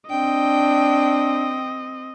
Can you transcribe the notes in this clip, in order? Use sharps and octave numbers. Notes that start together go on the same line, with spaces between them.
C4 D4 D#5 G5